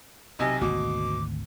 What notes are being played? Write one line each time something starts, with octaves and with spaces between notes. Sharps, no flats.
B1 C3 D#5 G#5
G#1 D2 B2 D6